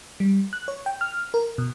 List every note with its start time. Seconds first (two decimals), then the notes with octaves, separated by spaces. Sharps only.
0.20 G3
0.53 F#6
0.68 C#5
0.86 G5
1.01 F6
1.34 A#4
1.58 B2